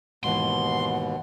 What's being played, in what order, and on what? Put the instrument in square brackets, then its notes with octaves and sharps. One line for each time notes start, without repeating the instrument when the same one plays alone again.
[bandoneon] D#2 B2 [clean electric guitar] G#2 E3 [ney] F#5 [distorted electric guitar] C6